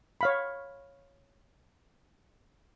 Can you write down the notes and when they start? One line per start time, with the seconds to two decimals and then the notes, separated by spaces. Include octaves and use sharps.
0.21 C#5 F5 B5